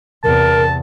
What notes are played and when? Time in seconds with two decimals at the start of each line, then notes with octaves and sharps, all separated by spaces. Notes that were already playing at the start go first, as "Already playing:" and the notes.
0.24 E2 C3 A#4 A5